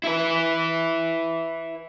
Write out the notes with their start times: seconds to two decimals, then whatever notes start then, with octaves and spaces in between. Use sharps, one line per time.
0.04 E4 B4